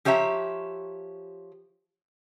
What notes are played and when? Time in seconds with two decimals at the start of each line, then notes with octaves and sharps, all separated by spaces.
0.05 F3 G4 C#5 E5 A#5